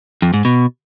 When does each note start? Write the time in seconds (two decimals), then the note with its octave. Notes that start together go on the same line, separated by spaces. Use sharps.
0.22 F2
0.34 G#2
0.45 B2